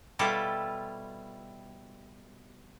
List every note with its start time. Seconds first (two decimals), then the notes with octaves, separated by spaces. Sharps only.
0.19 B2 G3 E4 F4 A4